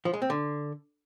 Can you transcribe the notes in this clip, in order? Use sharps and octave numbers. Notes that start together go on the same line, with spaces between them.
F3
G#3
C4
D3